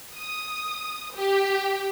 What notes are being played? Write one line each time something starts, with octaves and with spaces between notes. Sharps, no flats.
D#6
G4